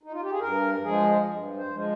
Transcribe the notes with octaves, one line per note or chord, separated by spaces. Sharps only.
D#4
F4
G4
G#4
G2 A#4
F3 G#3 G#4
G2
C5
F3 G#3